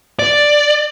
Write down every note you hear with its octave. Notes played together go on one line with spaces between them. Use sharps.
D5